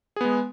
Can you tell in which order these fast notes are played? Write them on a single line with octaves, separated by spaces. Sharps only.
G#4 B3 G#3